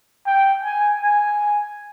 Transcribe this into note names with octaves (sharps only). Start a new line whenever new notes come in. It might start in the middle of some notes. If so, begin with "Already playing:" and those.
G5
G#5
G#5